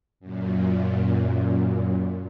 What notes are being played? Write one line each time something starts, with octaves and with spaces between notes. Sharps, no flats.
F#2 A#2